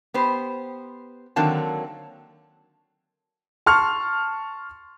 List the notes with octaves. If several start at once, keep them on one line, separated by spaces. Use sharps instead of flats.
B3 G4 C5
D3 D#3 F#3 A#3 C4 A5
A5 C6 C#6 F6